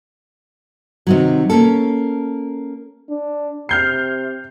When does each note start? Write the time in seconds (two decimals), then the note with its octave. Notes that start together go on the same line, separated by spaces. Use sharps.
1.07 C3 D#3 F#3
1.50 A#3 C#4 A4
3.09 D4
3.69 C3 F6 G6 C7